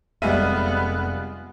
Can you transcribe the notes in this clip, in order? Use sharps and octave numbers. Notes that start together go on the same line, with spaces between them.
F1 G3 G#3 B3 F4 E5 D#7